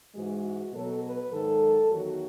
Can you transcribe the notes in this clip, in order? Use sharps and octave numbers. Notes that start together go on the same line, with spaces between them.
G#2 E3 G#3 F#4
B2 F#3 A4
B4
G#2 D#3 F#3 A4
E2 D#3 F#3 F#4